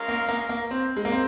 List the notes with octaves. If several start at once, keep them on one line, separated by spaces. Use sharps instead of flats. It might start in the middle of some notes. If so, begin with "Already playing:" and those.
Already playing: G#3 C#4 F4 A#4 F5
A#3
A#3
A#3
C4
G#3
A#3
C4